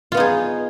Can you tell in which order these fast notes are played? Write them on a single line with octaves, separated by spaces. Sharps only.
F4 B3 D#4 G#4